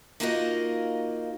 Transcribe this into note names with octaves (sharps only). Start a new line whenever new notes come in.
A#3 D#4 F4 F#4 A#4 D#5